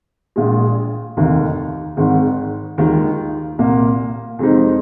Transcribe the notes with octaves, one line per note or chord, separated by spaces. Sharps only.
A#1 A#2 G#3
F1 D#2 D#3
G#1 G#2 D#3
D#2 D#3 G#3 F4
C2 A#2 A#3
F2 C3 G#3 C4 D#4